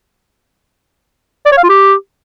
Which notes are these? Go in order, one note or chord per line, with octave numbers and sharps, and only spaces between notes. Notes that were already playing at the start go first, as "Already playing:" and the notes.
D5
C#5
F5
F4
G4